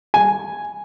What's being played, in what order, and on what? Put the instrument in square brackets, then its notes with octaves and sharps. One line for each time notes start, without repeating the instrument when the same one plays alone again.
[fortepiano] G#5